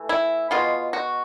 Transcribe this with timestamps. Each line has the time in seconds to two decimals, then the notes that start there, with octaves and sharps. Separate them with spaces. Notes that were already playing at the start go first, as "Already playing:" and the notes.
Already playing: E3 A3
0.09 E4
0.51 B2 G#3 B3 F4
0.93 F#4